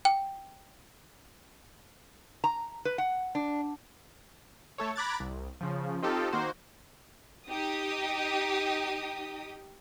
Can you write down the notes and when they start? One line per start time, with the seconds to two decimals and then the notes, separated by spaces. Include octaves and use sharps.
0.05 G5
2.44 A#5
2.85 B4
2.98 F#5
3.35 D4
4.78 A3 A4 C#5
4.96 A#5 B5 D6 F#6 G#6 A6
5.20 C2
5.61 C#3 F3
6.02 C4 D#4 F4 G4 A4
6.33 D#3 A#3 F#4 C5
7.48 D#4 G4 D#6